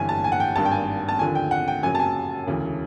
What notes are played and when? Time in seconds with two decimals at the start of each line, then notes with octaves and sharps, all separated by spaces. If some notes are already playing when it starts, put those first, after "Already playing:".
Already playing: G1 G2 E3 G#5
0.09 A5
0.24 G#5
0.32 F#5
0.40 G5
0.56 G#1 G2 D#3 A5
0.65 G5
0.71 G#5
1.08 A5
1.19 D#2 D3 F3 G#5
1.35 G5
1.51 F#5
1.68 G5
1.83 F#2 C#3 F#3 G#5
1.95 A5
1.99 G#5
2.47 E1 D2 C#3 E3